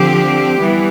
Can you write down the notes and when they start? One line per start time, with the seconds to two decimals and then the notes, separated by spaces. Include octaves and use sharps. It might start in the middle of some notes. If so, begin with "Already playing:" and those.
Already playing: D3 F3 C4 G4
0.60 E3 G3 B3